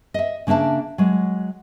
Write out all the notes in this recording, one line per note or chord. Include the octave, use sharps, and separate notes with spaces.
D#5 E5
C#3 A#3 D4 E5 A5
F#3 G#3